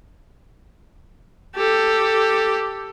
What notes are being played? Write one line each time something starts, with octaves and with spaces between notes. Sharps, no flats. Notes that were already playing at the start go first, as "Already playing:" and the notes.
G4 A4